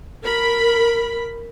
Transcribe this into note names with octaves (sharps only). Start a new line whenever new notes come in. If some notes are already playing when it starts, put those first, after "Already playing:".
A#4 B5